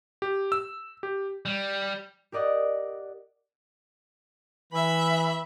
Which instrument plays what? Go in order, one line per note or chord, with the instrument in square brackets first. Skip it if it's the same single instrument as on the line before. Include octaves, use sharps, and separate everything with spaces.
[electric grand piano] G4
E6
G4
[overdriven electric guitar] G3
[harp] G4 A#4 D5 D#5 F#5
[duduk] E3 [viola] E5 B5